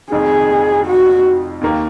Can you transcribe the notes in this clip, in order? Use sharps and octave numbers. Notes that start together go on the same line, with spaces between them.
F1 F2 D#3 G#4
F#4
D#2 D#3 A#3